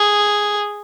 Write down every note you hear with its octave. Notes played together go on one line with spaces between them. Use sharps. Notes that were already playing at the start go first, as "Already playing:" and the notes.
Already playing: G#4